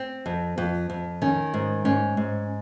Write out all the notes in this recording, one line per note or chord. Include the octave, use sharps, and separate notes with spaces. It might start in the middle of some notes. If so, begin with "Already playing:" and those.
Already playing: C4
F2
F2
F2
D#3 C#4
G#2
G#2 C#4
G#2